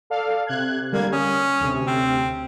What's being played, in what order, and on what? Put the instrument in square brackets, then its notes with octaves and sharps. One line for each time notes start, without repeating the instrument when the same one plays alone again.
[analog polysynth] A4 D5 F5
C3 F#6 G#6
[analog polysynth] D3 G3 G#6 [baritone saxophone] A#3
[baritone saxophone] C#4 [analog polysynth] D#6
[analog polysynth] D2 C3
[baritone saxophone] C4